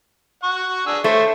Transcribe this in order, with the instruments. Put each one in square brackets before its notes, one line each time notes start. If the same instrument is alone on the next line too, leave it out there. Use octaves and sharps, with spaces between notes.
[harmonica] F#5 C#6
D4 G#4 E6
[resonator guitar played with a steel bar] A3 [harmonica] C5 C#5 E5